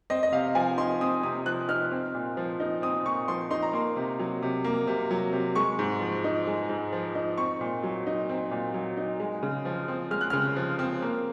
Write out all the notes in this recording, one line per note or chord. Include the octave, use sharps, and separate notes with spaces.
C4 D#5
D#5
C3 F5
F3 G#5
D#4 C6
C4 D#6
C3 D#6
F3 F#6
D#4 F6
C4
A#2
F3
D#4
C4 D#6
A#2 C#6
F3 C6
D#4 C6
A#5
A#3 C6
C3
F#3
C3
A#3
C3
F#3
C3
G#3 C#6
G#2
F3
D#4
G#3
G#2
F3
D#4
C4 C#6
A#2
F#3
D#4
C4
A#2
F#3
D#4
G#3
C#3
F3
C4
G#3 F6
F#6
C#3 F6
F3
C4
A#3